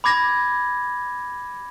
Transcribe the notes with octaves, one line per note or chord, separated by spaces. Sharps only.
B5 D6 G#6 A#6